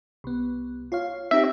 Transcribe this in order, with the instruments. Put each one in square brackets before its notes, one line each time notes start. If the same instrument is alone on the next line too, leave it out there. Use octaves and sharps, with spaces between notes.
[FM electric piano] C2 B3
F4 C#5 F5
[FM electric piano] C4 D#4 G4 [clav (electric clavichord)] E5